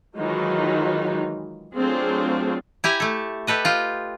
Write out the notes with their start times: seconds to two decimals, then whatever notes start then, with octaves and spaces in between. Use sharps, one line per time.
0.17 D#3 E3 F#3 G#3 D#4 F4
1.75 F#3 A3 C4 D4 F4 G#4
2.84 E4 G4 G#5 A#5
3.00 A3 A4
3.47 G4 A4 B4 D#5
3.65 F4 D#5 G5